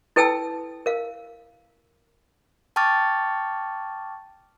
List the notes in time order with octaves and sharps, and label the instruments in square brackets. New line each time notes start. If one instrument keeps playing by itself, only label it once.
[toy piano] E4 A4 B4 G5 A5 E6
A#4 F5
[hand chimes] G5 A5 C#6 D6 F6 A6